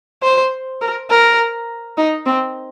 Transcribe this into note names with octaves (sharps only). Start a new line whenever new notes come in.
C5
A#4
A#4
D#4
C4